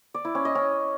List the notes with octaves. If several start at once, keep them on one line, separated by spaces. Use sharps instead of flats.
D5
E4
C#4
D#5
C#4